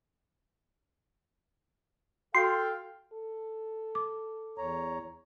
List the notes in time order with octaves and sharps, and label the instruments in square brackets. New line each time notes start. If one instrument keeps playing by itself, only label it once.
[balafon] F#4 [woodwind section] A4 F5 G5 [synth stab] C6
[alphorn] A4
[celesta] D6
[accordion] E2 C#5 A#5